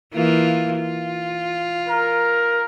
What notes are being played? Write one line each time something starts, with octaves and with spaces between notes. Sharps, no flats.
E3 A#3 F4
F4
A#4